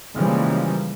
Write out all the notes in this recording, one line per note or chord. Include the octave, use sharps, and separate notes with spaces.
C#3 E3 F3 G3 G#3 A#3